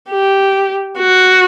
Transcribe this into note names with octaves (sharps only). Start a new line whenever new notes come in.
G4
F#4